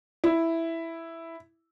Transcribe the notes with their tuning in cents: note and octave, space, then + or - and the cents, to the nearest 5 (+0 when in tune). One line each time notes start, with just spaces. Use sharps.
E4 +0